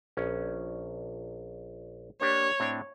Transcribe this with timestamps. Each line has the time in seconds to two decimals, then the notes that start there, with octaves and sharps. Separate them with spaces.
0.17 A#1 C#4
2.21 A#3 D4 G4 C#5
2.60 A2 C4 D4